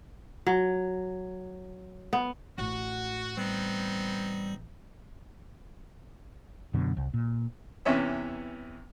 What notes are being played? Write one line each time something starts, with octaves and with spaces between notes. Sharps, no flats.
F#3
B3
A1 F#4
G3 B3 C4 D#4
F#2 B2 D3
C2
A#2
E2 C3 E3 C#4 C#5 E5